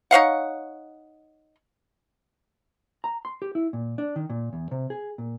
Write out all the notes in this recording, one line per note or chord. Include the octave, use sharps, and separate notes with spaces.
D#4 C#5 F5 F#5
A#5
C6
G4
E4
A#2
D4
D#3
A#2
E2
C3
G#4
A#2